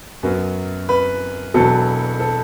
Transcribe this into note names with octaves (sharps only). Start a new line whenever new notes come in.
F#2 F#3 B3
B4
E1 E2 B2 F#3 A4
A4